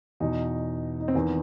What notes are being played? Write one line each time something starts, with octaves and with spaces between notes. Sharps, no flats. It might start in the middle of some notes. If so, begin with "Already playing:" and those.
E2 B2 D#4
D#4
C4
E2 D#3 B3